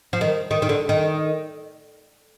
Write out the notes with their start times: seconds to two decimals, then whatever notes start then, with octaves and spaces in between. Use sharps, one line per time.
0.13 F3
0.21 D#3
0.51 D#3
0.62 D#3
0.69 D3
0.89 D#3